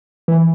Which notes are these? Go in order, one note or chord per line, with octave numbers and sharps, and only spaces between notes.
E3